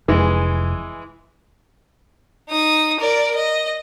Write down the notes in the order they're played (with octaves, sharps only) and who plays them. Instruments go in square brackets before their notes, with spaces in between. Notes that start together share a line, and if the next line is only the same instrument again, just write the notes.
[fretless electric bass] F1 [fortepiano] E3 G#3
[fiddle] D#4 D#6
A#4 D5
D#5